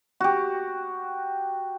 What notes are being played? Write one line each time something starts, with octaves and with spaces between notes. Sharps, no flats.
F#4 G4